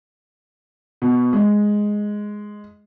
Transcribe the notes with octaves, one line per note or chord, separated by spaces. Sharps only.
B2
G#3